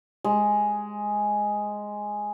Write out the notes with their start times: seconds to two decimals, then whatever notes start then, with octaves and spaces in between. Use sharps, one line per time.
0.24 G#3